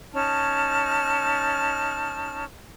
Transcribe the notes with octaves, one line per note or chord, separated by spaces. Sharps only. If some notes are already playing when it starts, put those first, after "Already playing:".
C#4 D#4 A5 F6